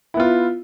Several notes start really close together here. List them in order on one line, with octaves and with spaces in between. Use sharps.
E4 B3 F4